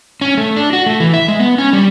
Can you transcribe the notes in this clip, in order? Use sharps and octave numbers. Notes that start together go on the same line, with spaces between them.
C#4
A3
D4
F#4
A3
E3
E5
G#3
B3
C#4
G3